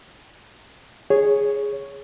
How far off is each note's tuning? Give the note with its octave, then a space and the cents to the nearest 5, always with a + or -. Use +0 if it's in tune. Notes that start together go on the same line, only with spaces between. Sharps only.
G#4 +0 C#5 +0